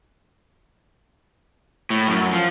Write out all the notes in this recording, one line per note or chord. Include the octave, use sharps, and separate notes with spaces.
A2
F#2
F3